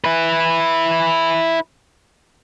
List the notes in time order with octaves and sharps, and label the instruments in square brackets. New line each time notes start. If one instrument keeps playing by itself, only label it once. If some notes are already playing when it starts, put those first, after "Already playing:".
[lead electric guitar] E4 B4